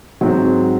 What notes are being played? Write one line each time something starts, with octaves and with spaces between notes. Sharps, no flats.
G#2 F#3 C4 F#4